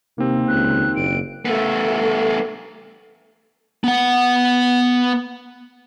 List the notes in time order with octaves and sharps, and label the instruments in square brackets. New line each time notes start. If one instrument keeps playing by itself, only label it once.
[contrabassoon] D#2 [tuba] C3 [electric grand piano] A#3 C4
[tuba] C#2 [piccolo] F#6
[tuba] F#1 [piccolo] D7
[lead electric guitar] A3 B3
B3 F#5